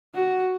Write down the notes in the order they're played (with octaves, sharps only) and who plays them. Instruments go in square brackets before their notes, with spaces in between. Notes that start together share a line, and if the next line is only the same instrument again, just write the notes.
[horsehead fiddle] F#4